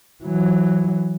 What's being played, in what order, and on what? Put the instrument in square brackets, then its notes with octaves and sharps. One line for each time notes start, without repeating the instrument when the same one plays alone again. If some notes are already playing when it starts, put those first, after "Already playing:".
[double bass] E3 F#3